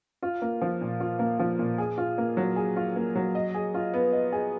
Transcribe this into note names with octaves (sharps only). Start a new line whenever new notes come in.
F4
A#3
F3
A#2
F4
A#3
F3
A#2
G#4
F4
A#3
F#3
G#4
F4
A#3
F#3
D#5
G#4
F4
B3
D#5
G#4